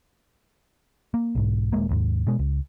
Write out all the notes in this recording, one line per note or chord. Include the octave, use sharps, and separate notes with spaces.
A#3
B1 G#2
D#1 F2 G#3 A#3
A1 D#2 G#2
B2 G#3
C#2